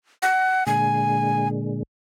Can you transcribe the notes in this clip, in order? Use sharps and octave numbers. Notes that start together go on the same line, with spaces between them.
F#5
A#2 D3 G#3 G#5